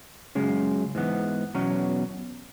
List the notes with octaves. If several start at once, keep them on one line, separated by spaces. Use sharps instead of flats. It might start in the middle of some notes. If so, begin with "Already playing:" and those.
F#2 C#3 G#3
G#2 E3 B3
E2 B2 F#3 C#4